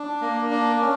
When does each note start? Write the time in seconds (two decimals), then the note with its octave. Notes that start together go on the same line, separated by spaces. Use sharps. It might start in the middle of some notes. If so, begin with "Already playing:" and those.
Already playing: D4
0.21 A#3
0.51 D4
0.81 C#4